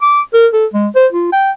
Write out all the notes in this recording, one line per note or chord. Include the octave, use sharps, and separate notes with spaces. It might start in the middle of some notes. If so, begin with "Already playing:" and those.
D6
A#4
A4
G#3
C5
F4
G5